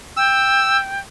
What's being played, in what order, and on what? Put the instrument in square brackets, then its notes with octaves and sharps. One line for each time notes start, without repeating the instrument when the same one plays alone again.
[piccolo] G5 [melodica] E6